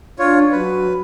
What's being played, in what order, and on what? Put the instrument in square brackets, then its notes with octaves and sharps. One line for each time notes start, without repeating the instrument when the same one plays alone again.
[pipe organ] D4 [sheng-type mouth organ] F4 C#5
[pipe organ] F#3 [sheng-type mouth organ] B4